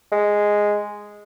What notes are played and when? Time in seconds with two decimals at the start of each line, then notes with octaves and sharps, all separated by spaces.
0.12 G#3